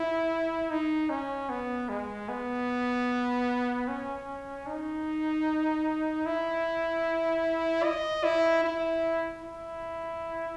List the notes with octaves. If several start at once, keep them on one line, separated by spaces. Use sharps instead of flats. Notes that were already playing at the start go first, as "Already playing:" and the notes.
Already playing: E4
D#4
C#4
B3
G#3
B3
C#4
D#4
E4
D#5
E4
E4
E4